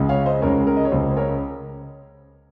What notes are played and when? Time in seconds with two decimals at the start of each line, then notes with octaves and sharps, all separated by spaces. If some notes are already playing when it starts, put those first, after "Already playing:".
Already playing: C#2 C#3 G#3
0.09 C#5 F5
0.26 C5 D#5
0.42 C#2 C#3 G#3 A#4 C#5
0.67 A#4
0.77 D#5
0.85 C#5
0.92 C#2 C#3 G#3 C5
1.11 C5
1.17 A#4 C#5